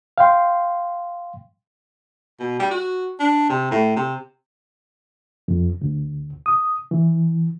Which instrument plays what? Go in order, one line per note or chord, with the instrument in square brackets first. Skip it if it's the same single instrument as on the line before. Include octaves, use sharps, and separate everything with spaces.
[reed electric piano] F5 G5 C6
[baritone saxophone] B2
G3
F#4
D4
C3
A2
C3
[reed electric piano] F2
D2
D#6
E3